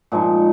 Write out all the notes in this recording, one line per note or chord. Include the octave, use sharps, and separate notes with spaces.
A#2 F3 G#3 D#4